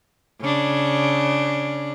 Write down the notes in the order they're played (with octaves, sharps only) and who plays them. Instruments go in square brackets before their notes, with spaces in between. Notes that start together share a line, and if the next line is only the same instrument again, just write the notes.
[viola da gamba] C#3 D4